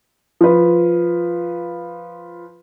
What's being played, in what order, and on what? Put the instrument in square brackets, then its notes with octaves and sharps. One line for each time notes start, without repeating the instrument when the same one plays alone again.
[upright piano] F3 B4